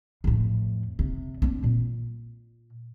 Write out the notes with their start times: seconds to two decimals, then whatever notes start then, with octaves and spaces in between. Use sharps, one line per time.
0.24 F2 A2
0.99 C3
1.42 C4 D4
1.64 A#2